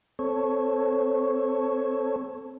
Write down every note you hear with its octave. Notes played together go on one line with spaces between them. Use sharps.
C4 A4 C#5